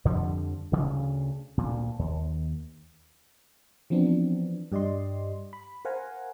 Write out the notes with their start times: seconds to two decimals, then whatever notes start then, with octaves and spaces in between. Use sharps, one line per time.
0.05 F2 D3 F3 G3
0.72 D2 C#3
1.58 D2 A#2
1.99 D#2
3.90 E3 F3 B3 C4 D4
4.72 G2 G4 D5 D#5 C6
5.53 B5
5.85 A#4 C5 F5 F#5 G#5 A#5